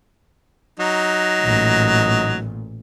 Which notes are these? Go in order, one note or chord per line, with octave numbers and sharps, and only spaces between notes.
F#3 D#4
A1 A#2